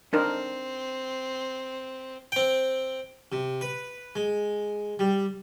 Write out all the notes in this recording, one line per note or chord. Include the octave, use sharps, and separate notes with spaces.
C4 D4 D#4 A#4
C4 G5
C3
B4
G#3
G3